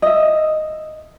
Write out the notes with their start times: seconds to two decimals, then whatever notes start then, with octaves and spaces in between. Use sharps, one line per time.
0.02 D#5 E5